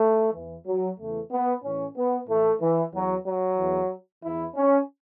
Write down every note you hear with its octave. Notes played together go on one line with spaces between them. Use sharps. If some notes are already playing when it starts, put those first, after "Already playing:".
Already playing: A3
E2 E3
F#3
E2 C#3 E3 A3
B3
A2 E3 C#4
B3
A2 E3 A3
E3
E2 E3 F#3
F#3
E2 E3
E2 E3 E4
C#4